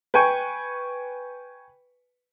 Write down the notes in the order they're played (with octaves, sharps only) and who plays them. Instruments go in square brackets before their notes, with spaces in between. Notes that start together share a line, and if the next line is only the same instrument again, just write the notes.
[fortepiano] B4 G5 G#5 C#6